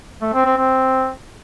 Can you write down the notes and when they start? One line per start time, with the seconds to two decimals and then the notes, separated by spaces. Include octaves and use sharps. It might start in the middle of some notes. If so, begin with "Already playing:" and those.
0.22 A3
0.33 C4
0.45 C4
0.57 C4